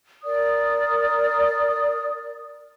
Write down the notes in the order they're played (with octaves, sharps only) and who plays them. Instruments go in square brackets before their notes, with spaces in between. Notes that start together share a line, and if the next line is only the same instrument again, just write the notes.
[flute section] A#4 D5 D#6